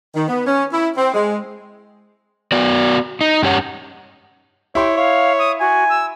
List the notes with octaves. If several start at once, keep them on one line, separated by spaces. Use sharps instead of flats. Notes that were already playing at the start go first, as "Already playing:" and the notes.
D#3
B3
C#4
E4
C4
G#3
B3 F#4 D5
D#4
G2 C#4 G4 C#5 F#5
E4 G4 C#5 C6
C#5 F5
D#6
F#4 G#5
E6